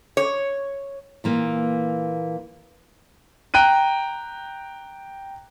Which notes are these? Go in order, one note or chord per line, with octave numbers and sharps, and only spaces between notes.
C#5
A#2 E3 A#3
G5 A#5 F#6 D#7